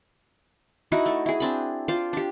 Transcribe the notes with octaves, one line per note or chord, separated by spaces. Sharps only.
D#4 E4 F#4 F#5
A3
E4 G#4
C4 D4 B5
F4 C5 D5
D4 G4